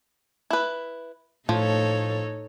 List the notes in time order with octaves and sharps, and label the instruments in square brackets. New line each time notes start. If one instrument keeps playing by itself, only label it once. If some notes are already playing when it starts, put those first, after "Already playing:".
[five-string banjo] E4 B4
[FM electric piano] A2 [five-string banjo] F3 [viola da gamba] D#4 A4 C#5